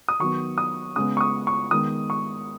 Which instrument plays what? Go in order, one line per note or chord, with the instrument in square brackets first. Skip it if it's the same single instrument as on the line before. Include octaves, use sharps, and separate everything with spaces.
[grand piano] D#6
D#3 F#3 B3 C#6
D#6
C#3 G#3 B3 D#6
C#6
D#6
C#6
D#3 G#3 B3 D#6
C#6